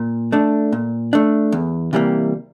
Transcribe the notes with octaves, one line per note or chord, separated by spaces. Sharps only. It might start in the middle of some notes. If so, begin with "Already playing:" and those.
Already playing: A#2
A3 D4
A#2
A3 D4
E2
C3 E3 G3 A#3